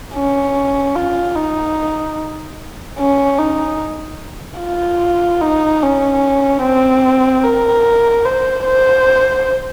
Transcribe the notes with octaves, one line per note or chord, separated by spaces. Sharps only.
C#4
F4
D#4
C#4
D#4
F4
D#4
C#4
C4
A#4
C5
C5